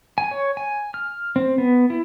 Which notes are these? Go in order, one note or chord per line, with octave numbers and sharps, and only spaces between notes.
G#5
C#5
G#5
F6
C4
B3
E4